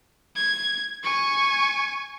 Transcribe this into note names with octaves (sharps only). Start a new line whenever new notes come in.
G#6
G#5 C#6